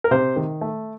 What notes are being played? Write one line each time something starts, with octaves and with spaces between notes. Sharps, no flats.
A#4
C3 C5
D#3
A3